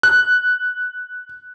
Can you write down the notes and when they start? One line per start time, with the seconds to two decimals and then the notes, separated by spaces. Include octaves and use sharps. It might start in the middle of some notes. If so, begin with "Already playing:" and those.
0.03 F#6